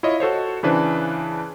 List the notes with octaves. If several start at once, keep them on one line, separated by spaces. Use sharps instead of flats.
E4 F4 C#5 D#5
F#4 A4 C5 C#5
C#3 E3 D4 B4 C5